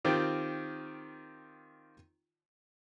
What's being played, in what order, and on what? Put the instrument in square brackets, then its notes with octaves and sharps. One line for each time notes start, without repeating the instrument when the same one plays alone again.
[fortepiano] D#3 C4 F4 G4